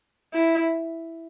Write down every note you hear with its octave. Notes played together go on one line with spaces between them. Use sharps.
E4